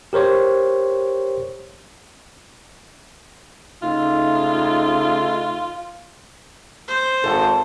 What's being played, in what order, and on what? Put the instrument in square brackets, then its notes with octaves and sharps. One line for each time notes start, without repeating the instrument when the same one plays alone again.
[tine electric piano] G4 A#4 C5 C#5
[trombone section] C#3 A3 D#4 [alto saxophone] F4
[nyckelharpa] C5
[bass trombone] G#1 [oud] A4